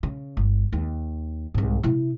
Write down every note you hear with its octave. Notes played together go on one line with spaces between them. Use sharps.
C#3
G1
D#2
C2 G#2
C3 E4